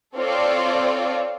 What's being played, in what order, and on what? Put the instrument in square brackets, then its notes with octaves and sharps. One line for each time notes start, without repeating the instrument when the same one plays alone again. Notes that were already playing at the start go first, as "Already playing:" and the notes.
[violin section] C4 F4 A4 C#5 D5